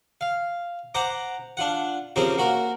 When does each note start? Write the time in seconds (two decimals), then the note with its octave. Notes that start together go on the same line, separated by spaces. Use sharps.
0.21 F5
0.94 C5 F#5 A#5 D6
1.57 D4 F4 F#5
2.16 C#3 F3 C4 C#4 G4 A#4
2.38 A#3 F#4 A#4